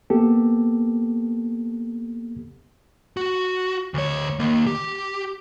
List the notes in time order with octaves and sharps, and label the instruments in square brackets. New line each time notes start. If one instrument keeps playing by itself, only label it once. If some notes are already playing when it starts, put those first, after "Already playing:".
[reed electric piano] A#3 B3 G4 A4
[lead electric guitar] F#4
D2 C#5
D#3 A#3
G4